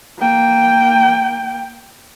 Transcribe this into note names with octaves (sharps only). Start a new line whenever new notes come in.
A#3 G5